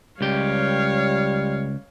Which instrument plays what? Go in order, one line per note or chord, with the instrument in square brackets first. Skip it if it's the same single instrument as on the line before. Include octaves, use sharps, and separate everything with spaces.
[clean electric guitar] C#2 G4 [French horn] G3 [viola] C#5 F5